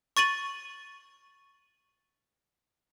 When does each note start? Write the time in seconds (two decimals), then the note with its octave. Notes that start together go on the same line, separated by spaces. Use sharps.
0.17 C#6 A6 D#7 F#7